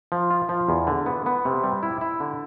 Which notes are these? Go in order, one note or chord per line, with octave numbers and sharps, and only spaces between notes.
F3
F4
F3
E2
D3
B3
B3
C3
G3
E4
E4
D3